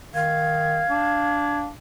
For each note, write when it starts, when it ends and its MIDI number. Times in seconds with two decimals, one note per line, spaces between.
0.14 0.84 51
0.14 1.65 77
0.14 1.59 92
0.90 1.69 62